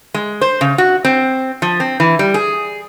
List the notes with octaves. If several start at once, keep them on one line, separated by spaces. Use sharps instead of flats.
G#3
C5
C#3
F#4
C4
F3
C4
E3
G3
G#4